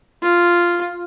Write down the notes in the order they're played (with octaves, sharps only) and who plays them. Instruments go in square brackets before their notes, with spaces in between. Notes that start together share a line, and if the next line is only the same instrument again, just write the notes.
[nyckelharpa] F4